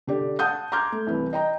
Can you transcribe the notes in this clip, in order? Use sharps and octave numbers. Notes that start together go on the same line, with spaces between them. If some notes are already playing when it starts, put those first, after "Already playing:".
D3 G4 D5
F#5 A5 D#6 G6
A#5 C6 D6 F6 G6 G#6
A3
C2 E3 B4
D#5 G5 A#5